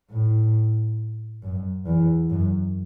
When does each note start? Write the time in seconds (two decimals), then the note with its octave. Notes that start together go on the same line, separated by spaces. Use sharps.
0.10 A2
1.43 F#2
1.86 E2
2.30 F#2